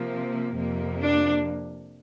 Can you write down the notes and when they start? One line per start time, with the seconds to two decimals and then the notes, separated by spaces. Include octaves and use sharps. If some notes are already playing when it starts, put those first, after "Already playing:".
Already playing: C3 F3 A#3
0.56 F2 C3 A#3
1.02 D4